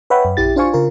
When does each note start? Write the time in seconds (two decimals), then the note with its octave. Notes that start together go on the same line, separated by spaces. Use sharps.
0.10 B4 C#5 E5 F#5 G5 B5
0.25 F#2
0.37 A#1 E4 G4 A6
0.56 D4 F4 C5 F5 G#5 C#6
0.74 C#3 F4 A#4